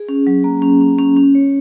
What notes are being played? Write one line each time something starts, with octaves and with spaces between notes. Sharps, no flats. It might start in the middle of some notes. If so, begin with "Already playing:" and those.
Already playing: G#4
C#4
F#3
A#3
C#4
C#4
C#4
C#4
C#5